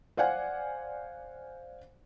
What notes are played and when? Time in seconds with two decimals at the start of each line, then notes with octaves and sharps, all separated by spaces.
0.17 C5 D5 F5 F#5 G#5